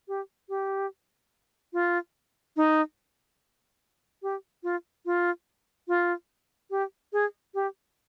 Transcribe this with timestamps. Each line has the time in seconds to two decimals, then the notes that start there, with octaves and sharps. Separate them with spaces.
0.08 G4
0.49 G4
1.73 F4
2.57 D#4
4.23 G4
4.63 F4
5.06 F4
5.88 F4
6.71 G4
7.13 G#4
7.54 G4